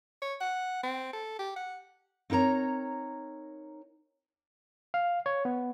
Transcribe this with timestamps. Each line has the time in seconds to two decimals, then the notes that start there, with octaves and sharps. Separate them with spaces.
0.22 C#5
0.40 F#5
0.83 C4
1.13 A4
1.39 G4
1.56 F#5
2.30 C4 D#4 A#4 C#5 A#5
4.94 F5
5.26 C#5
5.45 B3